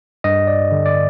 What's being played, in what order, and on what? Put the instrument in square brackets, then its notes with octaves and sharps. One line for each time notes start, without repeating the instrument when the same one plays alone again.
[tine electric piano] G2 D#5
D5
D3
D5